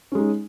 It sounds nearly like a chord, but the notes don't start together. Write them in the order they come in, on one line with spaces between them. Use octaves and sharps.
C#4 G#3 D#4